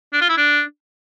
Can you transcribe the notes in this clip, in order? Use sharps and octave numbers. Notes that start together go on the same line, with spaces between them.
D4
F4
E4
D4